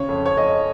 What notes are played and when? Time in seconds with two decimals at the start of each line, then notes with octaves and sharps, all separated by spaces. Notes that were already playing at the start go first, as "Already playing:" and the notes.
Already playing: C#3 C#5
0.09 F2
0.26 C#5
0.37 F2 D#5